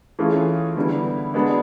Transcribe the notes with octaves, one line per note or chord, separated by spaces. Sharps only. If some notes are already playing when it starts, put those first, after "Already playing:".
E3 A3 C#4 F4 G#4
D3 G3 B3 E4
G#3 B3 D4 F#4